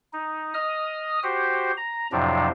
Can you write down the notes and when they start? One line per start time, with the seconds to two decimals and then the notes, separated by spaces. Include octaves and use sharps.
0.13 D#4
0.54 D#5 D#6 F6
1.23 F#4 G4 C5
1.77 A#5
2.12 F2 A2 C3 F3 F#3 D4